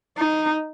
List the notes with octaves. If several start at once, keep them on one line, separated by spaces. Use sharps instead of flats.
D#4